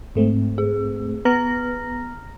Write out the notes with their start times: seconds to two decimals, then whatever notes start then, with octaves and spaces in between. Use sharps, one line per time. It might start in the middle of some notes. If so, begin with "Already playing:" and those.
0.15 G#2 A3 C4
0.58 G#4
1.25 B3 A#5 F6 A#6